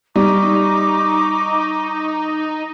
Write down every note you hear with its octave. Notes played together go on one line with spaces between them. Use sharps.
G3 D#4 A#5 C#6 D6